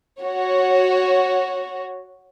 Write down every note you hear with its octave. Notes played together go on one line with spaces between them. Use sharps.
F#4 C#5